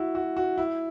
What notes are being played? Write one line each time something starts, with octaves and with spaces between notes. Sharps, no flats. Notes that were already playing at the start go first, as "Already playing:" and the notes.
Already playing: E4 F#4
F#4
F#4
E4